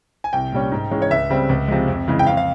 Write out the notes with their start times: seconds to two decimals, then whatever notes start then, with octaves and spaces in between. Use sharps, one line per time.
0.24 G#5
0.33 C2 G5
0.53 A#2 G3 C#4
0.72 G#2
0.91 E3 G#3 C#4
1.02 C#5
1.10 C#2 E5
1.30 C#3 G3 C4
1.49 C#2
1.68 C3 F3 G#3
1.88 F2
2.08 C#3 E3 G#3
2.19 G5
2.27 F2 F5
2.37 F5